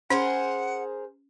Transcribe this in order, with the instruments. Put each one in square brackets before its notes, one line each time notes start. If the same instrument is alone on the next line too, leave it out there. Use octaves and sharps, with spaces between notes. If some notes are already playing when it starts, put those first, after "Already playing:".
[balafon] C#4 [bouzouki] G#4 A#4 C5 [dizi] F#5